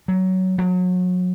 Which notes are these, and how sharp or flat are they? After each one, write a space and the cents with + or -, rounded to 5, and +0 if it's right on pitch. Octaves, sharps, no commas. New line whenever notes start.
F#3 +15
F#3 -30